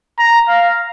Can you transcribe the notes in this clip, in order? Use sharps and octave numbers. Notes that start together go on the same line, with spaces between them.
A#5
F5